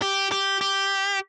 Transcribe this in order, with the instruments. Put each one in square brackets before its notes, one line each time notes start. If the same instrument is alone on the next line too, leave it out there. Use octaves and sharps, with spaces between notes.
[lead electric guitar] G4
G4
G4